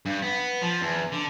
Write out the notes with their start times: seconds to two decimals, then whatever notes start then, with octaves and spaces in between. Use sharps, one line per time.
0.06 G2
0.22 B3
0.61 F3
0.81 E2
1.12 D3